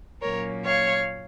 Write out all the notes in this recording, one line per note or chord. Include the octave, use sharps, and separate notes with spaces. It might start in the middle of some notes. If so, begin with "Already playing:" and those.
A#2 F#3 A#3 C#4 A#4 C#5
C#5 F5